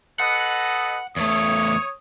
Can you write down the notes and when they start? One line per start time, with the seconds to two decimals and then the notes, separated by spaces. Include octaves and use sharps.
0.20 A4 B4 D#5 F#5
1.16 E2 A3 C#5 D#6